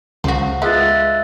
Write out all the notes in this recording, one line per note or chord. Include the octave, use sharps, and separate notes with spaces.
C#2 F3 F#4
G#3 B3 F4 E5 F#6 A6